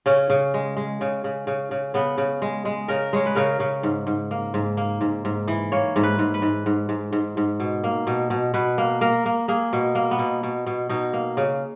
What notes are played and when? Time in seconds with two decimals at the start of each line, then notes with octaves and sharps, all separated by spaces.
0.06 C#3 C#4
0.30 C#3
0.54 G#3
0.77 G#3
1.01 C#3
1.24 C#3
1.47 C#3
1.71 C#3
1.94 C#3 B3
2.18 C#3
2.42 G#3
2.65 G#3
2.88 C#3 A#4
3.13 G#3 C#5
3.26 B4
3.35 C#3 A#4
3.60 C#3
3.83 G#2
4.07 G#2
4.31 A#3
4.54 G#2
4.77 A#3
5.01 G#2
5.25 G#2
5.48 E3
5.72 A#3 C#5
5.96 G#2
6.03 B4
6.19 G#2
6.34 B4
6.42 G#2
6.66 G#2
6.89 G#2
7.13 G#2
7.37 G#2
7.60 B2
7.84 A#3
8.07 B2
8.30 B2
8.54 B2 B4
8.78 A#3
9.01 A#3 A#4
9.26 A#3
9.48 A#3 G#4
9.73 B2
9.95 A#3
10.11 B3
10.19 B2
10.43 B2
10.66 B2
10.89 B2 D#4
11.13 A#3
11.37 C#3